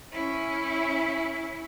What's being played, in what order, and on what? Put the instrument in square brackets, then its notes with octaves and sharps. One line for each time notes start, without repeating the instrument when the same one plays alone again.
[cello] C#4 E4